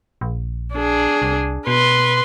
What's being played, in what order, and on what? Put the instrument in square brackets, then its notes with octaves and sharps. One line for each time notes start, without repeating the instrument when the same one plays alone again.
[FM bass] A#1
[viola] D4 G#4
[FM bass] C2
[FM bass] B2 [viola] B4 C6